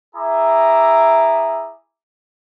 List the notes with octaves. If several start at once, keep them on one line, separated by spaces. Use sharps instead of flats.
E4 G#4 E5 A#5 D6